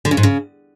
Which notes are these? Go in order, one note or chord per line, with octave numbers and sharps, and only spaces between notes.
D3
C#3
G#2
C#3